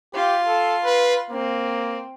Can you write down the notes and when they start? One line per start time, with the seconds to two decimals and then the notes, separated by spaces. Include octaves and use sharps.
0.15 F4 G4
0.47 A4
0.84 B4
1.31 A#3 C4